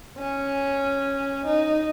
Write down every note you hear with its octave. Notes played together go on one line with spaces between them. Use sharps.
C#4
D#4